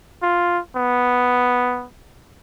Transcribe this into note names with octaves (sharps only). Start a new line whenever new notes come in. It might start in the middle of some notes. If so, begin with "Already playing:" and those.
F4
B3